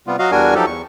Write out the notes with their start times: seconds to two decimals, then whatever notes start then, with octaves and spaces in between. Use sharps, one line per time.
0.07 C3 G3 B3 F4
0.19 F#3 F#4 D#5 F5
0.32 E2 G3 D4 F#4 A#4 G#5
0.55 F3 F#3 D#4 G4 A4
0.67 E2 C#6